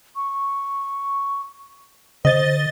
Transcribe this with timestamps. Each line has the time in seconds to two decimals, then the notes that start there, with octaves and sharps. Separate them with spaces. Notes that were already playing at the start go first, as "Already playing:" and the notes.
0.16 C#6
2.25 D3 C5 D#5 A6 G7